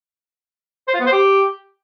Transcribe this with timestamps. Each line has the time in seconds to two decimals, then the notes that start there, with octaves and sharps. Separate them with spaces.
0.88 C5
0.94 F4
1.00 B3
1.06 C5
1.12 G4